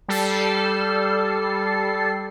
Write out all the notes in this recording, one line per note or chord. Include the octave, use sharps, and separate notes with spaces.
G3 A4 C7